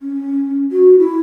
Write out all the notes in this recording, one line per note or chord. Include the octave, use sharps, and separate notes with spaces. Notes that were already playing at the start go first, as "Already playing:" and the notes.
C#4
F#4
E4